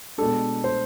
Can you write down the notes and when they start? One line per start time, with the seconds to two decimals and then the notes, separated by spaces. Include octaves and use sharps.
0.18 B2 G#3 D4 A4
0.64 C5